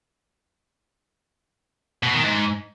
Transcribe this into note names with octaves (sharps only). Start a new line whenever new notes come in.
B2
D#3
G#2